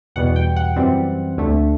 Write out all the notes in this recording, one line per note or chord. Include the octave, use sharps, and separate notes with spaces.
E2 B2 G3 B3 F#5
G5
F#5
F#2 E3 G3 C4
D2 D3 A3